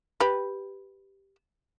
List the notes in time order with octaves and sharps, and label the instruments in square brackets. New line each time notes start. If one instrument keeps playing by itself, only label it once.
[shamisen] G4 B4